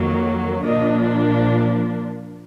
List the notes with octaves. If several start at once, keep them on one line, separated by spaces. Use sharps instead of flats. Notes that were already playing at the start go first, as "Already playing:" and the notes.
Already playing: F2 D#3 F#3 A#3
A#2 F3 A#3 D4 D#5